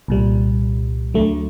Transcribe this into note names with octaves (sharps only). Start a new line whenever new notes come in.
C2 A#2 G3
D2 D3 F#3 A3